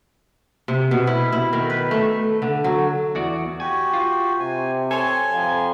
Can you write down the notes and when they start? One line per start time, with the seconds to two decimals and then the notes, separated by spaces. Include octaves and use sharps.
0.68 C3
0.91 B2
1.07 E4
1.32 E4
1.53 D#3
1.70 B4
1.91 A3
2.42 D3
2.64 F#3
3.15 E2 F#4 D5
3.60 F#4 G4 G#5
3.93 F4
4.39 C3 G#5
4.91 A4 C#5 G#5 C6
5.30 F2